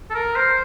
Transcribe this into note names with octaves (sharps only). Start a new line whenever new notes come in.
A4
A#4
C5